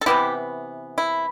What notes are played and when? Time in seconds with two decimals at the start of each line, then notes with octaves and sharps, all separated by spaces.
0.01 A4
0.06 C3 E3 G3 B3 E4 G4
0.98 E4